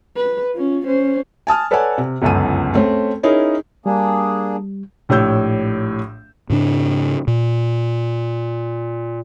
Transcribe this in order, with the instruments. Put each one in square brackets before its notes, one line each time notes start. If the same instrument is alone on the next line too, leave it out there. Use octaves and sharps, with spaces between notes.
[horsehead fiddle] B4
C#4 F4
C#4 C5
[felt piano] G#5 A5 D#6 F6
A4 B4 C#5 D5 F#5 G#5
C3
G1 C#2 F#2 A4 D#7
A3 C4 C#4
C#4 D#4 E4 G#4 A#4 C#5
[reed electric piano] G3 [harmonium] A#3 D4 G#4
[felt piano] A#1 A2 G4 C#5 E6 G6
[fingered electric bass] G#2 C#3 D4
A#2